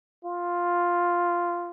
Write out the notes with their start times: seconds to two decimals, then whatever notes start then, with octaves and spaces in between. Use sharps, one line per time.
0.25 F4